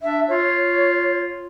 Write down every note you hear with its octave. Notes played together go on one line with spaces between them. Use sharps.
D4 E5
F4 C#5